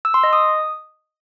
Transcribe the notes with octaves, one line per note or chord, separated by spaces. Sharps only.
E6
C6
D#5
D#6